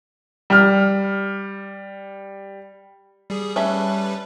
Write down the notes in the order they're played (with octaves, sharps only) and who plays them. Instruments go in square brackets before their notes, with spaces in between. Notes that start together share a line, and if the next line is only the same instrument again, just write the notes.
[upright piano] G3 F6
[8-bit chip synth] G3 G#4
[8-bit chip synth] G3 B4 [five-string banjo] A3 C#4 E5